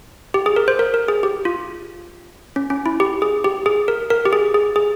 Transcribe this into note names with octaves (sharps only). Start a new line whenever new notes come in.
G4
G#4
A#4
C5
A#4
A#4
G#4
G4
F4
C#4
C#4
E4
G4
G#4
G4
G#4
A#4
A#4
G4
G#4
G#4
G#4